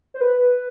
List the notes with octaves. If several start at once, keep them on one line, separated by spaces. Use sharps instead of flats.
C5
B4